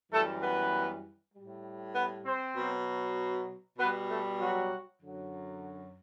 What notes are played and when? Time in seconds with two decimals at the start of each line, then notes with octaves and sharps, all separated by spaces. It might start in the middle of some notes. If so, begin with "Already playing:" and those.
0.11 F#2 E3 G3 A3 A4
0.41 B3 B4
1.34 A2 G3
1.94 B3 B4
2.25 C4 C5
2.55 B2 F#3
3.78 B2 G3 B3 B4
4.08 A3 A4
4.39 F#3 F#4
5.01 F#2 D3 F#3